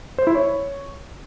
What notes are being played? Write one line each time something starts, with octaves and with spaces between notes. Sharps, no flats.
C5
E4
C#5